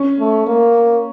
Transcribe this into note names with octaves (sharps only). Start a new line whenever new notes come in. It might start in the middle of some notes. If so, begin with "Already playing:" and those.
Already playing: C#4
A3
A#3